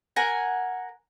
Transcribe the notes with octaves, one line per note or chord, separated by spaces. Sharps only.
A#4 F#5 G#5